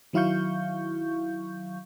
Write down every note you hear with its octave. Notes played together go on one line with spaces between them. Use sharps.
D#3 F#3 E4 F5 C#6 G6